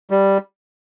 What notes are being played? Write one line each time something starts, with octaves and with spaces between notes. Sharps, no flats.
G3